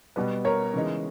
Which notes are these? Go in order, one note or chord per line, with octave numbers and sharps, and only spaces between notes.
B2 G3 B3
A#4 C#5
C#3 E3 G#3 D#4